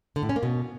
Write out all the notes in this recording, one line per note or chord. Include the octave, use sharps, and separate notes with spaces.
D3
A2
C#4
A#3
B2